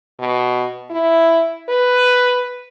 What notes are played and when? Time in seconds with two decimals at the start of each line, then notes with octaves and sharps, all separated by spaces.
0.20 B2
0.91 E4
1.69 B4